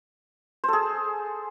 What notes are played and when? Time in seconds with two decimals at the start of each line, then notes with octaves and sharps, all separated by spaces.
0.64 C5
0.68 A4
0.73 G#4